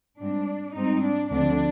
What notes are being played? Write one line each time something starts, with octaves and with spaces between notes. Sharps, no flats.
G#2 G3 C4 D4
G#2 G3 C4 D#4
D4
D2 D3 F3 C4 D4